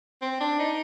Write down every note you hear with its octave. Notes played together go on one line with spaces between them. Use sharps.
C4
D4
D#4